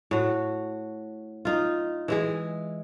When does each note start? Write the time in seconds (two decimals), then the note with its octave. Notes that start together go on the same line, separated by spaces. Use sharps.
0.11 A2 F#4
1.45 D#4 F4
2.08 E3 G#3 G#4